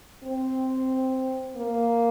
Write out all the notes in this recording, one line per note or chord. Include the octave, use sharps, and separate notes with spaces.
C4
A#3